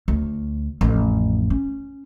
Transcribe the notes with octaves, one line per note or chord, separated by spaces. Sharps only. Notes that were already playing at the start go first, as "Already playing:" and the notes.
D2
A1 F2
C#4